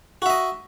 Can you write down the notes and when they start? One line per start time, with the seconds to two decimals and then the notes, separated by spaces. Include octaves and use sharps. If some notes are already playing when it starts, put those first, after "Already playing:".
0.22 F#4
0.26 E5
0.30 D#5